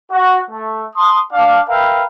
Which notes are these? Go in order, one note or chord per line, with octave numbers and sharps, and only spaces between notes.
F#4
A3
A5 C6 D#6
D4 F5
A#4 B4 E5 F5 G5